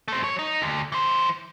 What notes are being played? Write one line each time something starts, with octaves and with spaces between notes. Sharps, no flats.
A3 C4
F#3 C#5
D#4
D2
E3 C5